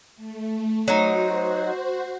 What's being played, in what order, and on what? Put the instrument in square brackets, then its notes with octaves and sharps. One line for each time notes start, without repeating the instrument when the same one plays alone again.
[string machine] A3
[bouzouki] F#3 D#4 [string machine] F#4 C5